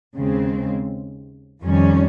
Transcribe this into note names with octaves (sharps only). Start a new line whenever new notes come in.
D#2 C#3 G#3 C4
F2 D#3 G3 C#4